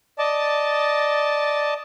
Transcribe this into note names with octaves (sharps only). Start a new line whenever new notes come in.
D5 D#5 A5